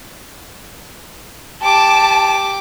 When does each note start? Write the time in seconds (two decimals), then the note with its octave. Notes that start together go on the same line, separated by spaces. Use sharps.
1.63 G4 A5 D6